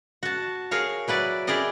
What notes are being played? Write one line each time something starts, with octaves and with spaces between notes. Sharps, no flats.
F#4 A5
G#4 A#4 C#5 F5
F#3 E4 B4 D5
E4 G4 G#4 A#4 D5 D#5